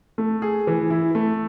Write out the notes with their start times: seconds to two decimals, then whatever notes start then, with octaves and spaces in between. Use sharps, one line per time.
0.18 A3
0.42 G#4
0.67 E3
0.90 E4
1.15 A3